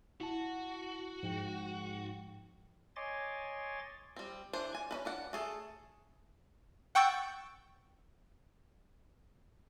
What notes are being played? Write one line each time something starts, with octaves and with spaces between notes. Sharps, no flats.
E4 F#4 A5
G#2 F3 G5
C#5 D#5 G#5 C6 D6 A6
G3 C4
E3 D4 C5
G#5
C#4 D#4 B4
D4 D5 F#5
A3 G#4 A4
F#5 G5 C#6 E6 G6 A6